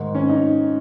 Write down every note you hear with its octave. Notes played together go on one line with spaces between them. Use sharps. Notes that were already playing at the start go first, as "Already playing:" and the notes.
Already playing: G#2 D#3
C#4
D#4